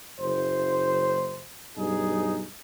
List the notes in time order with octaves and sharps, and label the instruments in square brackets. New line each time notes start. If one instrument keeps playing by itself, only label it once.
[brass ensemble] F#1 C5
B1 G2 D#4 G#4